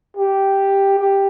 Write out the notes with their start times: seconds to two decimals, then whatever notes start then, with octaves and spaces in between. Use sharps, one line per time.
0.16 G4
0.99 G4